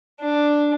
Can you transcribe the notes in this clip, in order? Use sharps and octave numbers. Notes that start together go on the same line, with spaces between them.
D4